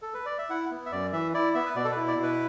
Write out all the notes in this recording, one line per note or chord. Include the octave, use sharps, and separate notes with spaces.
A4
B4
D5
E5
E4 F#5
B3
E5
F#2 D5
E3 E5
E4 D5
B3 E5
B4
B2 D5
A4
B4
E4
D5
B2
B4